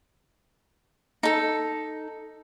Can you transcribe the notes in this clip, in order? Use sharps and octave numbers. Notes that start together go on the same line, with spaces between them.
D#4 A4